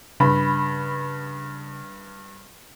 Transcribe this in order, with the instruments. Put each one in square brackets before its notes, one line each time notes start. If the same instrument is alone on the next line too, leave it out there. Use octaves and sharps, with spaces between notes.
[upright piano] G2 [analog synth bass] C#3 [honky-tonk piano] B5